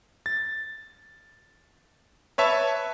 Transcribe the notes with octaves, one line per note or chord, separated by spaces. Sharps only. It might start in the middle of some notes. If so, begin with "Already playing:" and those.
A6
B4 C#5 E5 A5 C#6